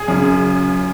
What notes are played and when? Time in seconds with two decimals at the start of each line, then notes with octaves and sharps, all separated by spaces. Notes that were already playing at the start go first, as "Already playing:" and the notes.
Already playing: G#4
0.08 F#2 C#3